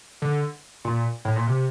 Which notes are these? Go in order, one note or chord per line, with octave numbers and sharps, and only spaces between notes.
D3
A#2
A2
A#2
C3